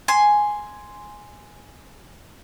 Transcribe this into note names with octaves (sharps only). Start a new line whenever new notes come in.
G#5 C6